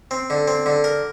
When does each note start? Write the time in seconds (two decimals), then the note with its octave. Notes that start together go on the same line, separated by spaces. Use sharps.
0.11 C4
0.30 D3
0.48 C4
0.66 D3
0.84 A#4